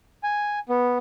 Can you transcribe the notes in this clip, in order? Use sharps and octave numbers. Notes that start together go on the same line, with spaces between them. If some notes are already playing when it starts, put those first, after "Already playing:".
G#5
B3